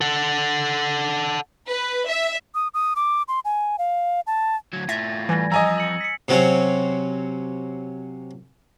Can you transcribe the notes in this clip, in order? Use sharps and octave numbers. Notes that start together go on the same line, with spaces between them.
A4 F#5
B4
E5
D#6
D#6
D6
C6
G#5
F5
A5
D2 F#3 G#6
A2 F4 E5 A6 A#6
E3 G3 G#5 G#6 A#6
F2 F3 D#5 G#5 A#5 E6
C#7 F#7
B6 C#7
C3 F#3 C4 C#4